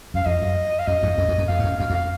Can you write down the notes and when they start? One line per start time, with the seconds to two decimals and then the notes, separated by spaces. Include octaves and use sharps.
0.14 F#2 F5
0.26 F2 D#5
0.42 F#2
0.79 F5
0.87 F#2 D#5
1.03 F2 G#2
1.18 F#2
1.28 F2
1.38 F#2
1.48 F2 F5
1.59 G#2
1.64 F#2
1.79 F#2 F5
1.90 F2
1.94 F5